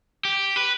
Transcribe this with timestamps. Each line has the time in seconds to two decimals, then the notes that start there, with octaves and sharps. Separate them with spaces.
0.25 G4
0.56 B4